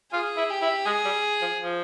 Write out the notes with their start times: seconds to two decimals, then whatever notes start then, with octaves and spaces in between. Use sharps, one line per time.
0.13 F4 G#4
0.37 E4
0.50 G4
0.62 E4
0.86 G#3 G#4
1.05 G3
1.42 F3
1.60 F3